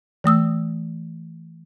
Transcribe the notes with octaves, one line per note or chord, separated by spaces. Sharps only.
E3 A3 D#6 E6